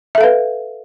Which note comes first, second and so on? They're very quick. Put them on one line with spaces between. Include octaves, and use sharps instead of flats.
E5 A4 F5 B4